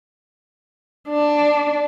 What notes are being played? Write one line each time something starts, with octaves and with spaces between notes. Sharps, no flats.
D4